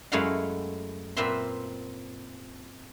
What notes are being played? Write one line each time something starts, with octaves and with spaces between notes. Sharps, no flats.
F#2 G#3 A3 E4 F5 F#5
A#2 C4 B4 E5 C6